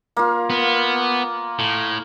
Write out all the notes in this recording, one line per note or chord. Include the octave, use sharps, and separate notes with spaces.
A#3 F4
B3
A2